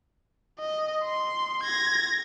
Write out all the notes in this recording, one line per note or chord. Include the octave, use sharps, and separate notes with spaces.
D#5
C6
G#6 A#6